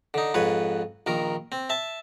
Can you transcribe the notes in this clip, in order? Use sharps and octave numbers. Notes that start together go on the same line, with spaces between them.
D3 D#4
F2 G#2 B4 C#5
A#1 D#3 A#4
C4
E5 A5